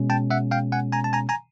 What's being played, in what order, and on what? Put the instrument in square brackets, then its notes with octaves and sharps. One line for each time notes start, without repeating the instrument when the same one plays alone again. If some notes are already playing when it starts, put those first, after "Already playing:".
Already playing: [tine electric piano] B2 G#3 C#4
G5 A5
E5 F#5
F5 G5
F#5 G#5
G#5 A#5
A5
G#5 A#5
G#5 A#5